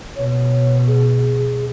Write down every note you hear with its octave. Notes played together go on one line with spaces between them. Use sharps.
B2 C#5
G#4